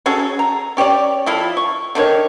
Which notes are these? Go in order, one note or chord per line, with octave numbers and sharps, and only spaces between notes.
C#4 F#4 G#4 A4
A#5
C#4 G4 C#5 D5
F3 E4 F4 A4
C#6
D3 D#3 F#4 C#5